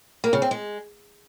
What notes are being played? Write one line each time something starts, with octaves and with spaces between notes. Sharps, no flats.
A#3
C#3
C4
G#3